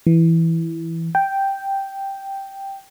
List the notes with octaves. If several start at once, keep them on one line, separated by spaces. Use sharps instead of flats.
E3
G5